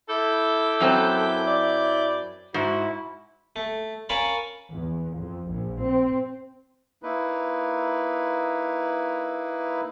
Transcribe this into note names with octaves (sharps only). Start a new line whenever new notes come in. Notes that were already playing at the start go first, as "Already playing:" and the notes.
E4 A4 D6 G6
F#2 F#3 C4
D5
G#2 E4 F#4
A3
C#4 A#4 C#5 F5 A5 B5
E2
F2
A#1
C4
A#3 D#4 E4 B4